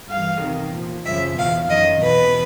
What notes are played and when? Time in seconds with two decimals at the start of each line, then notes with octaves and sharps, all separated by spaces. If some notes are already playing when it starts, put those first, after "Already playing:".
0.08 G2 E3 F5
0.41 E2 C3 D#3
0.73 A#2 F3
1.05 F#2 C#3 F3 E5
1.37 E2 B2 F5
1.69 F#2 D#3 D#5
2.02 E2 B2 B4